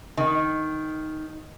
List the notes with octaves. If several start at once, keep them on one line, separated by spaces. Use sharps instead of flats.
D#3